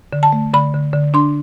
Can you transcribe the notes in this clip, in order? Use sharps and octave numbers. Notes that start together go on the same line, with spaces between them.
D3
A5
A3
D3 B5
D3
D3
D4 C6